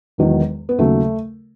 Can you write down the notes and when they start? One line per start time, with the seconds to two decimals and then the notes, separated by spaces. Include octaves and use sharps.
0.18 E1 E2 D#3 F#3
0.69 B3
0.78 D#2 C#3 F#3 A3